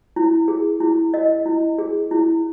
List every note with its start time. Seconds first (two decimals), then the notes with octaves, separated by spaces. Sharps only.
0.16 E4
0.48 G#4
0.81 E4
1.14 D#5
1.46 E4
1.78 G#4
2.11 E4